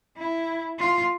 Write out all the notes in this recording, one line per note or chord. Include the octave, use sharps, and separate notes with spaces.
E4
F4